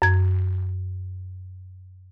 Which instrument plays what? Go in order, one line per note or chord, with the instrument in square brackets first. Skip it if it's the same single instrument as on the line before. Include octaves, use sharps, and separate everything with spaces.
[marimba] F#2 G#6